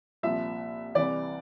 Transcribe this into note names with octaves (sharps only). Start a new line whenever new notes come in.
C2 A#2 F3 E5
C2 C3 E3 D5